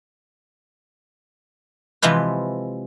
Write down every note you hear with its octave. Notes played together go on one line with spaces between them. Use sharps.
C3 E3 F3 G#3 B4